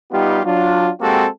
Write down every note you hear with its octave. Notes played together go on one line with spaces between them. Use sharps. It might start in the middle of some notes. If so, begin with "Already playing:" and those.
G3 B3 D#4 F4 G4
F#3 D4 F4
G#3 A#3 C4 F#4 G4 A4